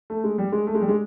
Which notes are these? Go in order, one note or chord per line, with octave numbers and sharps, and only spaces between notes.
A3
G#3
G3
G#3
A3
G#3
G3
G#3